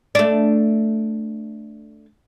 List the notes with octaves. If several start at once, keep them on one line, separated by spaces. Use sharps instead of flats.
A3 D4